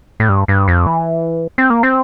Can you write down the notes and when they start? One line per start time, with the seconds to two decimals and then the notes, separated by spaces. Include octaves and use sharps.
0.20 A2
0.29 G2
0.48 G2
0.68 F2
0.87 E3
1.58 C4
1.70 A#3
1.83 C4